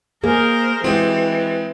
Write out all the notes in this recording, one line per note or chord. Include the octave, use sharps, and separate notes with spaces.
A#3 G#4 A#4 C5
E3 G#3 C4 F#4 G4